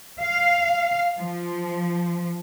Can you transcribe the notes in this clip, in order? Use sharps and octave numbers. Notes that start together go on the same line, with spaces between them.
F5
F3